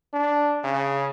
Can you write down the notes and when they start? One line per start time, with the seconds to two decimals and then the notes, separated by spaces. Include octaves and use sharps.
0.14 D4
0.64 C#3